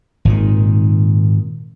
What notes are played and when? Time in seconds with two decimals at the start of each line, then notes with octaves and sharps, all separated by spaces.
0.25 G#1 A#2 D#3